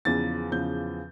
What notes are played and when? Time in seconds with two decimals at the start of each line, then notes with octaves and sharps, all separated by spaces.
0.05 E2 C#3 F3 A6
0.51 E2 C#3 F3 G6